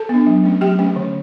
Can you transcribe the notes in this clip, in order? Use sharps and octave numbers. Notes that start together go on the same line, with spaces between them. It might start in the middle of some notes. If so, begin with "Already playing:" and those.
Already playing: A4 A5
B3 D4
F#3
A3 C#4
F#3 G4 G5
A3 C#4
D3